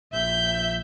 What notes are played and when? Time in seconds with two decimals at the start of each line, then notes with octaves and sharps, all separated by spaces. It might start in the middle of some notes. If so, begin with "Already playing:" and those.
0.13 A#1 E5 G6